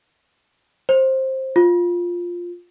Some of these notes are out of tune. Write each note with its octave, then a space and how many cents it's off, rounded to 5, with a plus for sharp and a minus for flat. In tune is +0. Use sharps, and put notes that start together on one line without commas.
C5 +15
F4 +5